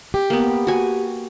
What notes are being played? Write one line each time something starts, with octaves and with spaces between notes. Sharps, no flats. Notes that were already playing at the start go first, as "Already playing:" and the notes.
G4
A#3 B3
F#4 G#5